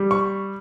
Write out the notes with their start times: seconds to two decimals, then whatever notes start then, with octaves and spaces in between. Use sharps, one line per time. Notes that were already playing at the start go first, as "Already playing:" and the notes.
Already playing: G3
0.11 C#6